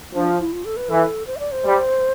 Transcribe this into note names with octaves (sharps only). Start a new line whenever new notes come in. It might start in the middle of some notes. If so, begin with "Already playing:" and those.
F3 D4
E4
F4
A4
B4
E3 A4
C5
E5
D5
C5
G3